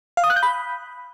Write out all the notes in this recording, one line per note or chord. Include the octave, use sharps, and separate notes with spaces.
F5
D#6
F#6
G6
B5